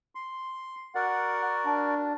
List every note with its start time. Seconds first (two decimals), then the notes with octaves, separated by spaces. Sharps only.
0.15 C6
0.95 F#4 A#4 D5 F#5
1.66 D4